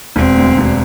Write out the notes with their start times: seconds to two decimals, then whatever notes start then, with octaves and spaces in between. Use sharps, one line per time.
0.16 E1 C4
0.37 D2
0.58 E1